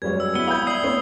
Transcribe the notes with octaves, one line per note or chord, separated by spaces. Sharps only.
F#2 G3 G#3 B4 C#5 G#6
E6
B3 E4 G7
E5 G5 B5 D#6 G6 G#6
D5 D#6 C7 F#7
A3 B3 C4 C#5